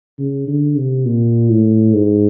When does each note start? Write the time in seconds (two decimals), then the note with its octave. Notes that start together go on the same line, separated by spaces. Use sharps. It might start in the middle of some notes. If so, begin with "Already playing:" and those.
0.19 C#3
0.48 D3
0.78 C3
1.06 A#2
1.49 A2
1.94 G#2